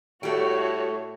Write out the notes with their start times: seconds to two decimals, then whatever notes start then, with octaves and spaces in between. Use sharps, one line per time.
0.23 A2 G3 A3 F#4 C#5